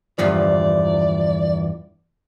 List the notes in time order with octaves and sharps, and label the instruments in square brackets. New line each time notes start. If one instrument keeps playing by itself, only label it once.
[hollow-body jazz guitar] E2 G2 F3 [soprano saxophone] D5